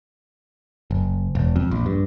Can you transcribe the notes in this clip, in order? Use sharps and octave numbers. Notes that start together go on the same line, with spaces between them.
F#1
E1
F2
A#1
G2